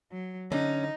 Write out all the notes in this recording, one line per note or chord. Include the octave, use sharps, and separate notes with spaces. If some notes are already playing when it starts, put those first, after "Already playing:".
F#3
D3 C#4 D#4